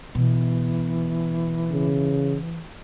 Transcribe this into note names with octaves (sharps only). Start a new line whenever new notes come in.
B2 E3
C#3